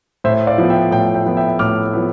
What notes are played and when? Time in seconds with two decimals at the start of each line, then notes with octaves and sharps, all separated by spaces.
0.24 A2 C5 E5
0.47 D5 F5
0.58 F3 B3
0.70 E5 G5
0.91 A2 E5 G5
1.14 E5 G5
1.26 F3 B3
1.37 E5 G5
1.59 A2 D6 F6
1.93 F3 B3